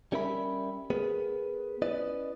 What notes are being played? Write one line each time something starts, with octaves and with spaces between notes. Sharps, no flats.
G3 C#4 A#4 E5 B5
B3 G#4 A#4 B4
C#4 E4 B4 D5 D#5